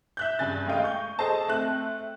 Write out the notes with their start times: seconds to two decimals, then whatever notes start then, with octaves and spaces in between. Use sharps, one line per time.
0.17 E5 F#6 G6
0.39 G2 C#3 G#5 A6
0.66 G#3 A3 D#5 F5 G5 D#7
0.84 C#6 G6
1.19 G#4 A4 C5 D#5 A5
1.48 A3 C4 F#6